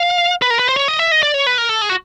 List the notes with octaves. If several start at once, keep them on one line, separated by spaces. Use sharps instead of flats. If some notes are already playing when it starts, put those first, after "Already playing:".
Already playing: F5
B4
A#4
B4
C5
C#5
D#5
E5
D#5
D5
C#5
B4
A#4
A4
G#4
F#4